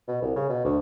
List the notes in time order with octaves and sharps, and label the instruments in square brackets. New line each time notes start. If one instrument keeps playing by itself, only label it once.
[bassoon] B2
C2
C#3
B2
D2